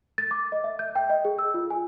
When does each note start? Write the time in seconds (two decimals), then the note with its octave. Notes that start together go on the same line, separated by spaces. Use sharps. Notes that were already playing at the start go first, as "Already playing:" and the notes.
0.18 A6
0.31 D6
0.52 D#5
0.64 E5
0.79 G6
0.95 G5
1.10 D#5
1.25 G#4
1.39 E6
1.54 F4
1.70 G#5